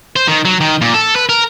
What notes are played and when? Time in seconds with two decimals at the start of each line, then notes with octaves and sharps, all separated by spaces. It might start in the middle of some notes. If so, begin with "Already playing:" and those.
0.16 C5
0.28 D#3
0.45 F#3
0.61 D#3
0.81 A#2
0.94 A4
1.16 B4
1.29 A#4